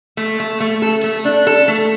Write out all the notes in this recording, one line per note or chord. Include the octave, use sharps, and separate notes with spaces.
A3
A3
A3
A4
A3
D4
A4
A3